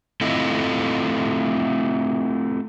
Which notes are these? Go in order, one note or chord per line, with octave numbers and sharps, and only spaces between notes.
A3 C4 E4 F4 A4 D#5